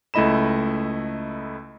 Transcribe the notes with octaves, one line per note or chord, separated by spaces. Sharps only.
C#2 A3 E4 D#5 B5 E7